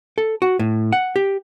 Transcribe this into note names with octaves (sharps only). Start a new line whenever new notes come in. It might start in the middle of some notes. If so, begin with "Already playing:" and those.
A4
F#4
A2
F#5
G4